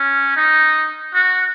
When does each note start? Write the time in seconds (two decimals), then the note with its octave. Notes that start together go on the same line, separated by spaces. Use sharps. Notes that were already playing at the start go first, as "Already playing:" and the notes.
Already playing: C#4
0.37 D#4
1.14 F#4